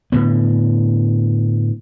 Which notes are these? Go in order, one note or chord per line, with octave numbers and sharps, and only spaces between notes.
A2 D3 B3